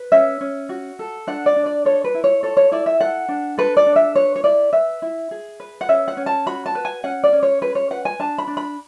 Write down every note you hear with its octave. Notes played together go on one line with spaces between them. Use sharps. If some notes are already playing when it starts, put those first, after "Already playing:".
Already playing: B4
C#4 E5
C#4
F#4
A4
D4 F#5
D5
D4
D5
A4 C#5
B4
E4
C#5
A4 C#5
C#5
E4 D5
E5
A4 F#5
D4
A4 B4
D5
D4
E5
B4 C#5
C#5
E4 D5
B4 E5
E4
G#4
B4
F#5
C#4 E5
F#5
C#4
A5
F#4 B5
A5
B4
G#5
C#4 F#5
D5
C#4
C#5
G#4 B4
C#5
B4 F#5
G#5
D4 A5
B5
D4
B5